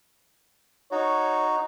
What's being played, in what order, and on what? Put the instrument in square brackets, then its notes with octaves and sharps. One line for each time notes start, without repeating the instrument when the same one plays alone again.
[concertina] D#4 F#4 [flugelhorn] C#5